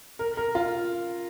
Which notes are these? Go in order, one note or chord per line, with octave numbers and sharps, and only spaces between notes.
A#4
A#4
F4